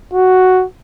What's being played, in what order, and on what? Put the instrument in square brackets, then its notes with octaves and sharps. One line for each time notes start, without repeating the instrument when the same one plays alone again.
[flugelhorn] F#4